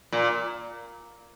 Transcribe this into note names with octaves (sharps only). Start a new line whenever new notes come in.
A#2